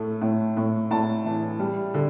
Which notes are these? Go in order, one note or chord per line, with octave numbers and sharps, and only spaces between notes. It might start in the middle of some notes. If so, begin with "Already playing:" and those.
Already playing: A2 A3
A2
A2
A2 A5
E3
G3
D3